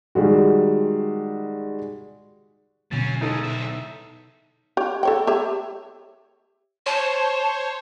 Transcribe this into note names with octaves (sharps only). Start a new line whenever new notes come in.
D#3 G3 G#3 F#4
B2 D3 F#3 C#4 A6
E3 G#3 D#4 A4
B1 E5
G4 C#5
A4 C#5 G5
G4 C#5 E5
C5 C#5 A5